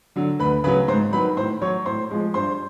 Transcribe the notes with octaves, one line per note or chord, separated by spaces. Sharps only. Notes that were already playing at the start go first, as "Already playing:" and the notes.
D3 F#3
D2 B4 B5
C#3 F#3 B4 B5
G#2 C5 C6
D#3 F#3 B4 B5
A2 C5 C6
F#3 C#5 C#6
A2 C5 C6
F3 G#3
G2 C5 C6